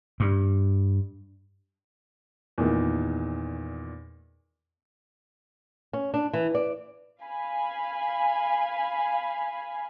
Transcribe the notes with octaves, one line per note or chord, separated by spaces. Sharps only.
G2
E2 A#2 D#3
C#4
D4
E3
D5
F5 G#5 B5